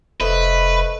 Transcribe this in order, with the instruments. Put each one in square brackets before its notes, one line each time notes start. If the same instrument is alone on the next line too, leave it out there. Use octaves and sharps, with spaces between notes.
[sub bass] F1 [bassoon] A3 [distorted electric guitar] B4 [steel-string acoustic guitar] C5 D#5